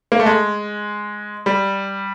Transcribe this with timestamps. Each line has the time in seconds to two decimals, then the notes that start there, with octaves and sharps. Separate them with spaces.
0.12 A#3
0.20 A3
0.26 G#3
1.46 G3